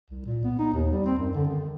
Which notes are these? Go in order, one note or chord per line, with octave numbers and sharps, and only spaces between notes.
C2
A#2
B3
D#4
D#2
G3
C4
F#2
D3
D#3